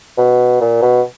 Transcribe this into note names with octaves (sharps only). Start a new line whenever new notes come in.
B2
A#2
B2